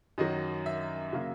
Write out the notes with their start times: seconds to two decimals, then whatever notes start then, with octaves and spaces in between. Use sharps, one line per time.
0.18 F#2 D#3 F#3 D#5
0.66 E5
1.13 C#3 F#3 A#3